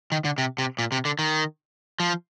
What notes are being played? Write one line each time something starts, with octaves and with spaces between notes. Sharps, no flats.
D#3
D3
C3
C3
A#2
C3
D3
D#3
F3